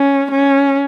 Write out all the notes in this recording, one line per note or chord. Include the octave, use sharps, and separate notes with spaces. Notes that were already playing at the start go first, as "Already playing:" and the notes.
Already playing: C#4
C#4